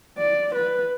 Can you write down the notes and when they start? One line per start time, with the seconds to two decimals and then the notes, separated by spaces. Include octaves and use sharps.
0.17 D5
0.55 B4